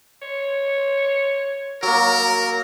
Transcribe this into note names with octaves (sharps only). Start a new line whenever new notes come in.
C#5
F#3 A#3 A#4